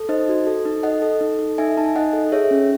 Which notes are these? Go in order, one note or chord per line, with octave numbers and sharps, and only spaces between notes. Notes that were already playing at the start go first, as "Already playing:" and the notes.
Already playing: A4
D#4 C5 D#5
F#4
A4
D#4
A4 D#5 F#5
A4
D#4
A4
D#4 E5 G#5
D#4 A5
G#5
D#4 D#5 F#5
A4
G#4 C#5 E5
C#4